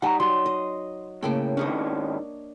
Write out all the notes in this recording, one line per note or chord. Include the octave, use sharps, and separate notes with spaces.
G3 D#4 F#5 G#5 A#5
F#3 C6
D#5
A2 C#3 A#3 G5
G#2 D#3 C#4 D4 C#5 D#5